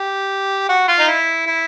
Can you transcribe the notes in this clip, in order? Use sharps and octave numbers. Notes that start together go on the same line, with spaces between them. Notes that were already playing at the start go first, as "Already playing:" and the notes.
Already playing: G4
F#4
F4
D#4
E4
E4